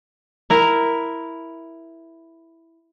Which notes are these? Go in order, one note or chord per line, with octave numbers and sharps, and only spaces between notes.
E4 A#4